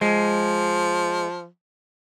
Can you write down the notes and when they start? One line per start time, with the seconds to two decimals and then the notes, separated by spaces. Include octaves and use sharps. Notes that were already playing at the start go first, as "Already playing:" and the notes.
0.02 F3 G#3